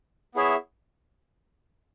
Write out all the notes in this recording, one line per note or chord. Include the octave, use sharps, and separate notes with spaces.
B3 E4 G#4 C#5 E5